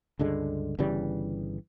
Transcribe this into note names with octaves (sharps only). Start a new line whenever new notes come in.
C#2 G2 D3 G#3
G1 C#3 E3 G3